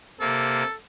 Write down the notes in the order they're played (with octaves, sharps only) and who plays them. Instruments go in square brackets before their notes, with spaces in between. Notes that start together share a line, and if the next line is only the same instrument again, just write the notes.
[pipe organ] C3 A#3 [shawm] A4